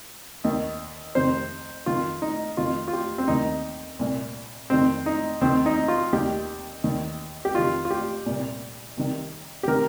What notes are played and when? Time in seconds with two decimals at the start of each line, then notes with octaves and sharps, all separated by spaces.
0.44 D#2 D#3
1.15 F2 C3 D#3 C5
1.86 F2 D#3 F4
2.22 D#4
2.57 F2 D#3 F4
2.88 F4
2.93 G4
3.18 C4
3.28 D#2 D#3 D#4
3.99 C2 A#2
4.70 F2 D#3 C4
5.06 D#4
5.41 D#2 D#3 C4
5.66 D#4
5.88 F4
6.13 D#2 D#3 G4
6.84 D#2 D#3
7.45 G4
7.55 F2 D#3 F4
7.85 F4
7.90 G4
8.26 C2 A#2
8.97 C2 C3 D#3
9.63 G4
9.68 C3 D#3 A#4